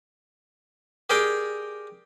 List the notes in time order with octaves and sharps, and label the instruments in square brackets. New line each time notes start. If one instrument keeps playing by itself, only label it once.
[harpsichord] G4 G#4 A#4 D5 G5